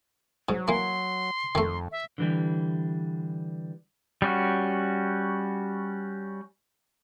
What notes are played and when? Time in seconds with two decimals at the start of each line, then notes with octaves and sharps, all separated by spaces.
0.49 G#2 F#3
0.68 E3 A#3 C6
1.55 F2 D#3 A3
1.92 E5
2.18 D3 E3 G3
4.22 G3 C#4 F#4